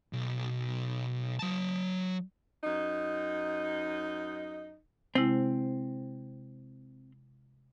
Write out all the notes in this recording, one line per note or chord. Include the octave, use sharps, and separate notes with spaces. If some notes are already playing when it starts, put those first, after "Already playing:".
B1
F#3 A5
F#2 D#4
C3 G#3 C4 E4